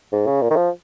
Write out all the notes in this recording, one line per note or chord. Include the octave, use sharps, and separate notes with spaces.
G#2
C#3
A#2
D#3
F3